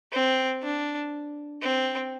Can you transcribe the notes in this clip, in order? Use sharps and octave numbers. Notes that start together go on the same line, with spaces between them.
C4
D4
C4